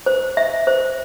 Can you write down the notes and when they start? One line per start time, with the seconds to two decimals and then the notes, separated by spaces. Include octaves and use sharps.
0.06 C5
0.37 E5
0.67 C5